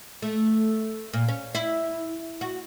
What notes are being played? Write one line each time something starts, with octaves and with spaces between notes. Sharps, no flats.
A3
A#2
C#4
E4
F#4